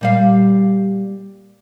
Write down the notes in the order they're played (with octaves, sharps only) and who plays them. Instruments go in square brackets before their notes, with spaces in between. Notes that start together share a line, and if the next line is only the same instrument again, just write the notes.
[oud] A#2 G3 F5